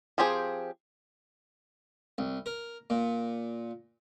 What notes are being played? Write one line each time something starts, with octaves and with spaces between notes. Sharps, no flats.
F3 C4 G4 G#4 C5
C2
A#4
A#2